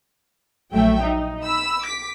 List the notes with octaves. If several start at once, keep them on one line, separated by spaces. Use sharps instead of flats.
A#1 F#3 A3 E5 G5
D#4
B5 E6
D6 B6